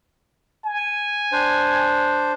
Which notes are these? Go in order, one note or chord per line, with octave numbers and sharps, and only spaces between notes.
G#5
D4 C5